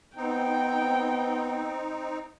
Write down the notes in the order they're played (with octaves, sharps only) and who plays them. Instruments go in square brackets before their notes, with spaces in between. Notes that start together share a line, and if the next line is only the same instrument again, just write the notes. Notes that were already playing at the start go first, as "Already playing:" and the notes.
[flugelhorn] B3 [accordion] C4 D#4 [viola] G5